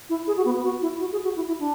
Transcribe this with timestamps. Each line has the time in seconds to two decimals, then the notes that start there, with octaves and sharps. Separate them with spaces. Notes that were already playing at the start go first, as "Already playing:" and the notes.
0.10 E4
0.27 G#4
0.37 F#4
0.45 B3
0.55 B3
0.64 F#4
0.82 E4
1.01 F#4
1.12 G#4
1.24 F#4
1.36 E4
1.48 E4
1.60 D4